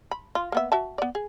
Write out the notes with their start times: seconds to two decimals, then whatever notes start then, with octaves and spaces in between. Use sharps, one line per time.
0.11 B5
0.35 F4
0.52 A#3 B3 E5
0.72 F#4 E5 A5
0.98 B3 D5
1.15 G#4